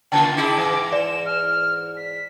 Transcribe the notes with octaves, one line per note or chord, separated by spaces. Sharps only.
C#3 A#3 F4 G5 A5
D#4 E4 G#4 D6
G#2 E3
D5 E7
F6
B6